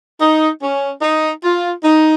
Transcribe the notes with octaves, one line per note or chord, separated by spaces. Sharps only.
D#4
C#4
D#4
F4
D#4